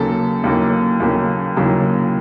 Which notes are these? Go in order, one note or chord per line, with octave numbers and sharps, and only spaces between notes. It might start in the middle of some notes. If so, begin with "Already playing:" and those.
Already playing: D#2 C#3 F#3 A#3 A4
D#2 C#3 F#3 A#3
D#2 C#3 F#3 A#3
D#2 C#3 F#3 A#3